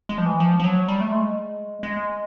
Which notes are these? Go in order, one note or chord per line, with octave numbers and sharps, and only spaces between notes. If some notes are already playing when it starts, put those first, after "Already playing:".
G#3
F3
E3
F3
F3
F#3
G3
A3
G#3
G#3